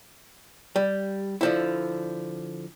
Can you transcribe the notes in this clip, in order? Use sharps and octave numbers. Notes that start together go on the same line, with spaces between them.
G3
D3 F3 E4